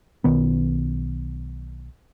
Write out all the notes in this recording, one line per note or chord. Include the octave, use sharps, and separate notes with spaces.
B1 D#3 B3